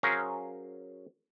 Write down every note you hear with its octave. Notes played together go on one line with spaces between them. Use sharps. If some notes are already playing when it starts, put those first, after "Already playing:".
F#3 C#4 G#4 A#4 C5 F5